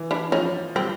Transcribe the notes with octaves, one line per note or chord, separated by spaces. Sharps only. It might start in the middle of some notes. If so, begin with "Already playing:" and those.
Already playing: E3
D4 E4
F3 C#4 D#4
G3 C4